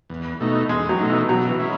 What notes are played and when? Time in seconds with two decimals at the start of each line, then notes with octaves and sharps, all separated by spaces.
0.09 E2
0.40 B2 A3 D#4
0.69 E2 G#3
0.89 F#3
0.99 B2 A3 D#4
1.10 E3
1.29 B2 F#3
1.48 E3
1.59 G#3 C#4 E4